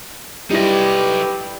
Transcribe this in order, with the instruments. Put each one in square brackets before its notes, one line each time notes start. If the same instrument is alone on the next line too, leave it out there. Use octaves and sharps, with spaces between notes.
[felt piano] G3 E4 A#6 [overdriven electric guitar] D#4 B4 [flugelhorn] G4